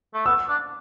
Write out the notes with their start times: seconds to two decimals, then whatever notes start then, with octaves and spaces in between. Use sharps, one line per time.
0.14 A3
0.26 B3 E6
0.49 D4